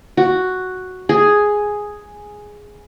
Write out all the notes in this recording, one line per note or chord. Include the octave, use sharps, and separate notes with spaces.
F#4
G#4